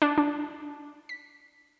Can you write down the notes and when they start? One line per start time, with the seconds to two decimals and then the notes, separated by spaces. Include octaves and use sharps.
0.02 D4
0.18 D4
1.09 B6